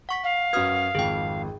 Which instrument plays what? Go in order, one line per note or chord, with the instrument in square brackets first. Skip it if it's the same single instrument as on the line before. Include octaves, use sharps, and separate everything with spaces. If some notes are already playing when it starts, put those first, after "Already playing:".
[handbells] F#5 C#6 B6
[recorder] F5
[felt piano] F#2 F#4 B4 [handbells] D#6 F6 G#6
[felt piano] G#1 F2 [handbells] G#4 G5